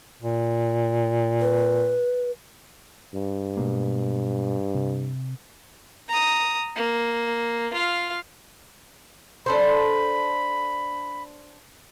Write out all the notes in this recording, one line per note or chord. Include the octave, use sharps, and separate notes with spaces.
A#2
B4
G2
B2 G#3 A#3
C3
A#5 D#6
A#3
F4 F5
D4 A4 C5 B5